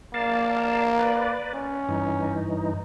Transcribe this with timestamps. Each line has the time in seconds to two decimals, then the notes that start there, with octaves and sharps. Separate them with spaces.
0.14 A#3 D5 F5 A5
0.99 B4 D5
1.54 C#4
1.89 G2 E3 D#4